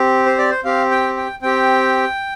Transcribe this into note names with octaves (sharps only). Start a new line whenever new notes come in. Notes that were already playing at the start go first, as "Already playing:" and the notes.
Already playing: C4 G4
C5
D5
C5
C4 G4 F5
G5
G5
C4 G4 G5